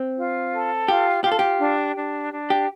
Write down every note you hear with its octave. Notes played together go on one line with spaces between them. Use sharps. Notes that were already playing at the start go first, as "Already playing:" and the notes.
Already playing: C4
F4
A4
F4 G4
F4 G4
A4
G4
D4
D4
D4
G4